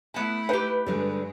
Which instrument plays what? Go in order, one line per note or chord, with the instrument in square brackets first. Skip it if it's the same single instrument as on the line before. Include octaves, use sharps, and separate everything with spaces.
[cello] A3 E4 [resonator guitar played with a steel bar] B3 A5
[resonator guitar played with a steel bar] D#4 G4 [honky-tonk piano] B4
[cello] G2 G#3 [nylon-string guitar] D3 G3